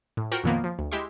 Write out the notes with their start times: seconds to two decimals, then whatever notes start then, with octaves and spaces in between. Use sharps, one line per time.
0.17 A2
0.31 F4 F#4 A#4 C5 F#5 G5
0.44 F2 A#2 D#3 F3 A#3 B3
0.64 F3
0.79 D2
0.92 G#3 E4 G4 E5 C6